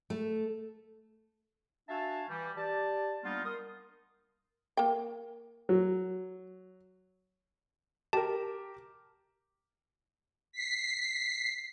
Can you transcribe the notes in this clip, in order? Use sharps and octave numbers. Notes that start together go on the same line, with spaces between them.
A3
D4 F#4 E5 F5 G#5 A5
E3 G3
G4 D5 A5
G3 A#3 B3 D4 D#4 F4
A#4 C6 D#6
A#3 G5
F#3
G4 A#4 A5
B6 C7